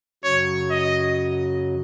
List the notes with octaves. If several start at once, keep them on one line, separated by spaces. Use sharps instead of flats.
F#2 C#3 F#3 C#5
D#5